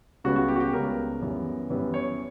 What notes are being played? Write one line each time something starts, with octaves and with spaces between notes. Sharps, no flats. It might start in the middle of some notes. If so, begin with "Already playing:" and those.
C#2 C#3 G3 B3 F#4
F#4
G4
F#4
G4
C#2 C#3 G3 B3 A#4
F#2 E3 G3 B3
F#2 E3 G3 B3 B4
C#5